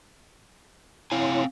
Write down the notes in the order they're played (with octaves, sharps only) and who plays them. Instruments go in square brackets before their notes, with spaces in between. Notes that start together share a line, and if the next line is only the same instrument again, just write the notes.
[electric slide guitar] C4 F5 G#5 [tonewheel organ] E4 C#5 C6